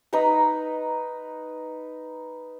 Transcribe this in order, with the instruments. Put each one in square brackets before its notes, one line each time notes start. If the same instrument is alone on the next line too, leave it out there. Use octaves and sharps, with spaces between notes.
[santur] D#4 B4 A#5 B5